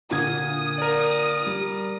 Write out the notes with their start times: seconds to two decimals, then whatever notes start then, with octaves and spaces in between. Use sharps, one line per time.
0.11 A#2 D3 D#6 G#6
0.78 A#4 D5
1.46 G3